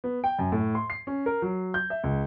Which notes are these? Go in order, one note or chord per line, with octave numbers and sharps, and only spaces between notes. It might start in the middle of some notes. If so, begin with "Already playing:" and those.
B3
G5
F#2
A2
C6
C7
C#4
A#4
F#3
G6
E5
C#2